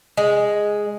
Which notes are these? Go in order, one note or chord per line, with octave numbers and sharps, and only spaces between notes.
G#3